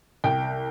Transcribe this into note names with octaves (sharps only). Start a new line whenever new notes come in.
C2 G5